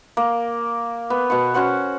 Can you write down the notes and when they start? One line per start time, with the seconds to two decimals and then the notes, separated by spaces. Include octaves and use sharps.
0.17 A#3
1.10 B3
1.30 B2 B3 C#6
1.54 C#4 F#4 C5 F#5